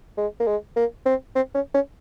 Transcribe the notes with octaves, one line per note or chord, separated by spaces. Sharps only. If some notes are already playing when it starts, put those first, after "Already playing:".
G#3
A#3
G#3
A#3
C4
C4
C#4
C#4